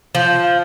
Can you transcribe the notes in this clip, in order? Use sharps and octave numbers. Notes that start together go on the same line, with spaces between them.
F3